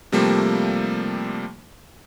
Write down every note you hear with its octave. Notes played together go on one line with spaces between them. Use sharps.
C3 F3 G3 A3 A#3